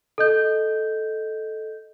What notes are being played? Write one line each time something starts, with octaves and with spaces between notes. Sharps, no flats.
A4 D#5 G6